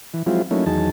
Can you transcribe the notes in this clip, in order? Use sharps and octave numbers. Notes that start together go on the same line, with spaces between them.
E3
F3 F#3 G#3 C4 E4 F4
F#3 A3 A#3 C#4 D#4 E4
E2 D#3 F#3 D#4 G#4 A5